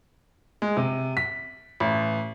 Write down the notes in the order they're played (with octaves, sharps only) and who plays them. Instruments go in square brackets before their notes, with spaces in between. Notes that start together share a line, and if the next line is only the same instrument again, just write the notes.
[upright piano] G#3
C3
B6
A1